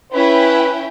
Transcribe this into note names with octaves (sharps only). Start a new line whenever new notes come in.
C#4 E4 B4 G5